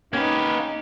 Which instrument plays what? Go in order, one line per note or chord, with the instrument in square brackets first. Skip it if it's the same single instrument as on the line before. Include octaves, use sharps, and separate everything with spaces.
[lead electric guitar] A#3 B4 [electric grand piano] C#4 G#6 [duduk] D#4 [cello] G4